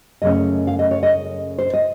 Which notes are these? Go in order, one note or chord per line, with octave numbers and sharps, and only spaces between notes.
F#2 C#3 A3 C#4 D#5
F5
D#5
C#5
D#5
C5
D#5